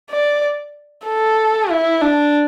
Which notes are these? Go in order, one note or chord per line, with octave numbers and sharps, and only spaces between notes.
D5
A4
E4
D4